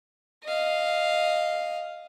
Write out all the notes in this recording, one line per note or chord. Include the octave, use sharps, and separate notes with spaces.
D#5 F5